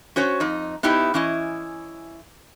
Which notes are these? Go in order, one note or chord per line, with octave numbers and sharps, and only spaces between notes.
C#4 F#4 C5 C#5
F2 D#4
B3 D#4 E4 G4 D#5
E3 C#4 E4 D#5